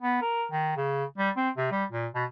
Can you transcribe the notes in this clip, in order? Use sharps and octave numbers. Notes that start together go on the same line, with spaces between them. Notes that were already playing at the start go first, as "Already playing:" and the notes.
B3
A#4
D#3
C#3
G3
C4
C3
G3
A#2
B2